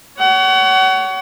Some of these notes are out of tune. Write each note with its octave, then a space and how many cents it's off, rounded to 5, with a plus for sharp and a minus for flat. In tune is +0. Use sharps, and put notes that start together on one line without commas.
C#5 +25 F#5 +30